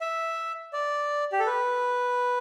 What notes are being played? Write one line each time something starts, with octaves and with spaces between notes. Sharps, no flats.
E5
D5
G4
A4
B4